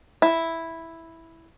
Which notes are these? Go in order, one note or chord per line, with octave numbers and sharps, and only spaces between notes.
E4